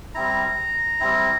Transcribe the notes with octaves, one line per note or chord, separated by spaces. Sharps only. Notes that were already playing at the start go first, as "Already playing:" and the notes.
G3 C4 E4 A#5
G3 C4 E4